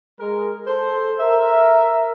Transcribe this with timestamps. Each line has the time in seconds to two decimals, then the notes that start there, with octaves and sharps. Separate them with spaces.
0.20 G#3 A#4
0.67 A4 C5
1.20 A#4 E5